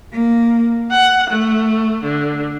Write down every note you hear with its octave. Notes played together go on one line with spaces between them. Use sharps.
A#3
F#5
A3
D3